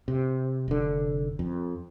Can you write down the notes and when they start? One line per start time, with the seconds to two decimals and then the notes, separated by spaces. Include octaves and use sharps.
0.08 C3
0.68 F1 D3
1.39 F2